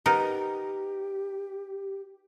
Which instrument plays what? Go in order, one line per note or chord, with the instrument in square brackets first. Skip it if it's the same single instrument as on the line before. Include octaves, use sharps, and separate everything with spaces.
[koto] B3 D#4 A#4 [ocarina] G4